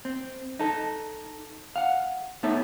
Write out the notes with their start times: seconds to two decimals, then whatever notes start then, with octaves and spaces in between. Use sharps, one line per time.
0.05 C4
0.59 D#4 A4
1.76 F5 F#5
2.43 A2 B3 D#4 A4 C#5 E5